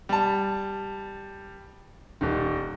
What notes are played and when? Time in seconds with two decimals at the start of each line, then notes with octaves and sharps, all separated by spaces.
0.09 G3 A5
2.21 D#1 D#3